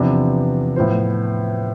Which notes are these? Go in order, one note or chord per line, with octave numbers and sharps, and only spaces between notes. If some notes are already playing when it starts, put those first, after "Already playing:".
Already playing: E2 C3 F3 B3 D4
A2 F3 B3 F4 C5